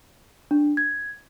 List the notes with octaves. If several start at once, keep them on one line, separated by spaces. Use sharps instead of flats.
D4
G#6